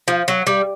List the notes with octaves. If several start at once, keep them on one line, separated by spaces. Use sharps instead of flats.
F3
F#3
G3